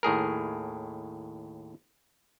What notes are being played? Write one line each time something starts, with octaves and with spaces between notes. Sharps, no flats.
D#2 A2 G#4 A#4